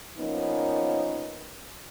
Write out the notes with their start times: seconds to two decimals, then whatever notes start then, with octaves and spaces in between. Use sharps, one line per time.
0.18 F3 A#3 B3 C#4 D#4